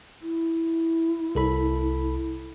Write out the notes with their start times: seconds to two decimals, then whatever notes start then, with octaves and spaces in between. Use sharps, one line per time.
0.22 E4
1.35 C2 A4 B5